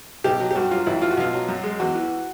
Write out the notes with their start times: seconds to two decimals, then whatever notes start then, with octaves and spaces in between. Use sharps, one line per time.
0.24 B1 G4
0.40 F#3
0.51 G4
0.55 G2 F#4
0.71 F#3 F4
0.87 A1 E4
1.02 F3 F4
1.11 F#4
1.17 B1 F4
1.33 F#3
1.48 F#2
1.64 G#3
1.80 E2 F#4
1.95 E3